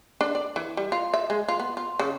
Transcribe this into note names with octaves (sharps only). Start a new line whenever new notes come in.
D4
D5
E3
G3
F4
E5
G#3
F4
B3
F4
C#3